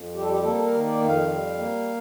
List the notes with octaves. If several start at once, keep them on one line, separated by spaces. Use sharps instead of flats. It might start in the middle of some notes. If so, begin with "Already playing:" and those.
Already playing: F2
G3 G4
A4
G4
A#3 A4
A4
A#4
D#3
D5
F2
F5
G3
A#3